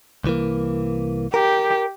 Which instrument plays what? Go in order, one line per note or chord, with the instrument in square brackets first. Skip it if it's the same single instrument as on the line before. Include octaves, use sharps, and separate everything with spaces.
[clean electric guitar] C2 E3 A#3
[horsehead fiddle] G4 [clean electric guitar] A#4